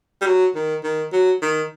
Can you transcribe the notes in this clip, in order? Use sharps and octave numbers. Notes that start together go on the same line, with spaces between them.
G3
F#3
D#3
D#3
F#3
D#3